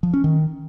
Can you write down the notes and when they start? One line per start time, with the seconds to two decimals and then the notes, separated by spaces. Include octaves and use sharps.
0.03 F3
0.14 C#4
0.24 D#3